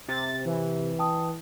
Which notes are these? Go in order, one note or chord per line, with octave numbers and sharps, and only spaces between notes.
C3 A6
E3
G5 A5 D#6